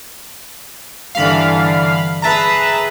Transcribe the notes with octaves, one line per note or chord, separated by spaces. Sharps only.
G2 D3 E3 F5 B5
G#4 B4 E5 A5 A#5